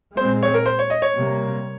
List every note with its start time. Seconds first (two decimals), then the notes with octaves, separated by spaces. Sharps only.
0.17 A#2 G#3 C4 C5
0.43 C#5
0.54 A#4
0.66 C5
0.79 C#5
0.90 D#5
1.02 C#5
1.15 C3 G3 A#3